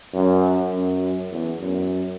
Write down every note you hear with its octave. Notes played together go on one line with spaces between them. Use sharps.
F#2
F#2
E2
F#2